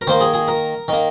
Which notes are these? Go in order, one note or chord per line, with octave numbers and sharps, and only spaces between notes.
A#4
D#3 A#3 C5
G#4
G#4
A#4
D#3 A#3